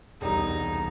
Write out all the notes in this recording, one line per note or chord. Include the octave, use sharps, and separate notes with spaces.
E1 C2 F2 G3 D#4 A#5